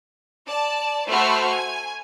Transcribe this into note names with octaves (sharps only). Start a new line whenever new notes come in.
D5 A5
A3 F#4 C5 B5 C#6 F6
G#5